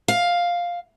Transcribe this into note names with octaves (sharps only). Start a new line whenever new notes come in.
F5